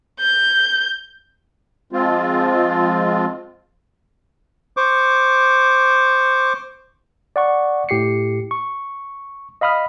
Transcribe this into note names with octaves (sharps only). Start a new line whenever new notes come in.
G6
F3 G#3 C4 F4
C5 C#6 D6
D5 F#5 C#6
A2 G4 C7 C#7
C#6
D#5 F5 B5 D#6 F6